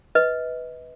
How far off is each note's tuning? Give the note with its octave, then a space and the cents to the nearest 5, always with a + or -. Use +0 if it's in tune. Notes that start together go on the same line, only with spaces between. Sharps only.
B4 +0 D#5 +30